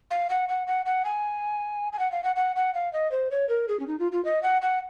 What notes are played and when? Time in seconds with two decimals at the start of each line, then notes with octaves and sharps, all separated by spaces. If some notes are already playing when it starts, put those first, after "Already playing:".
0.11 F5
0.30 F#5
0.49 F#5
0.67 F#5
0.86 F#5
1.05 G#5
1.93 G#5
1.99 F#5
2.12 F5
2.24 F#5
2.36 F#5
2.56 F#5
2.74 F5
2.93 D#5
3.11 C5
3.31 C#5
3.49 A#4
3.68 G#4
3.80 C#4
3.87 D#4
3.99 F4
4.12 F4
4.25 D#5
4.43 F#5
4.62 F#5